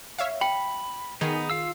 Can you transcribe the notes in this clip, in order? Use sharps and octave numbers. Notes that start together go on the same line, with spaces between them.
C#5 E5 F5
G5 B5
D#3 B3 D#4 G#4
F4 F5 E6